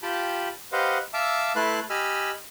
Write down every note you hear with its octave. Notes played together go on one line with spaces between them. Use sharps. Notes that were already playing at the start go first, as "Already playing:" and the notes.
F4 G4 G5 A5 B5
G4 B4 C5 D#5 F5 F#5
E5 F5 A5 D6 E6
A3 E4 B4 A5 C6 F#6
G4 D#5 G#5 B5 E6 F6